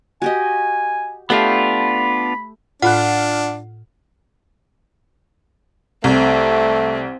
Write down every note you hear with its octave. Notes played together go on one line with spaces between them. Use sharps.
F#4 G4 D#5 G#5
A3 B3 D4 F4 G4 F5 B5
A2 D4 F4 F#5 B5 F#6
C2 A3 C4